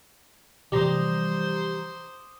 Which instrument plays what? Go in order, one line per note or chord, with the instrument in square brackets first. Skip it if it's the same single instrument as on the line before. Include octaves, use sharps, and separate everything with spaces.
[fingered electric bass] C3 E3 F3 [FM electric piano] G3 A#5 [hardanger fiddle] C5 [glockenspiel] D6 D#6